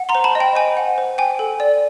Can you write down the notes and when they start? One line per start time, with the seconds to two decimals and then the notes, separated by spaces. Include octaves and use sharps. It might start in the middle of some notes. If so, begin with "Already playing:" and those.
Already playing: F#5
0.09 A#5 C6
0.15 C5
0.24 A5 B5
0.35 D#5
0.40 G5
0.55 C5 G#5
0.77 F#5
0.98 C5
1.18 G5 G#5
1.39 A4
1.60 D5